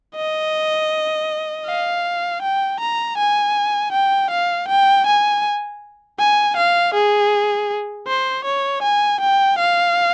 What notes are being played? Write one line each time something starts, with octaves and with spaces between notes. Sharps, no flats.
D#5
F5
G5
A#5
G#5
G5
F5
G5
G#5
G#5
F5
G#4
C5
C#5
G#5
G5
F5